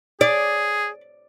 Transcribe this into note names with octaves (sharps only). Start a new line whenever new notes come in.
G#4 D5